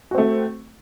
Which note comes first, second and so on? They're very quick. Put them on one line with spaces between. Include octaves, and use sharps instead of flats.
F#4 C4 A3